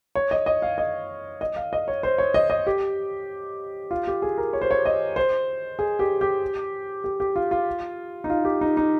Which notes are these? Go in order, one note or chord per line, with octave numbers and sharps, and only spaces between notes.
C#5
D#5
D#5
F5
D#5
D#5
F5
D#5
C#5
C5
C#5
D#5
D#5
G4
F4
G4
G#4
A#4
C#5
C5
C#5
D#5
C5
G#4
G4
G4
G4
G4
F4
F4
D#4
F4
G4
D#4
D#4